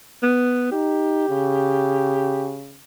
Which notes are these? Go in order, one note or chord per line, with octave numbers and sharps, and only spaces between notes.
B3
D#4 G4
C#3